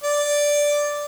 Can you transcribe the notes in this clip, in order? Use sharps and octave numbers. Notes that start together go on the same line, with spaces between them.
D5